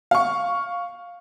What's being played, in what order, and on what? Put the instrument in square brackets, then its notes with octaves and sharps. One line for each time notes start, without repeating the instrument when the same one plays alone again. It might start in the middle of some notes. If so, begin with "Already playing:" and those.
[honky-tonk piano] F5 C#6